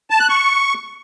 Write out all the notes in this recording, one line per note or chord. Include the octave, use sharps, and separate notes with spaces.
A5
F#6
C#6